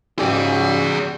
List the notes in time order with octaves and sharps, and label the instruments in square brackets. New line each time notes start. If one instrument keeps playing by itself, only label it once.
[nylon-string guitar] G#2 G4 [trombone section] C#3 [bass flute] F#3 [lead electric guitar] G#4 D5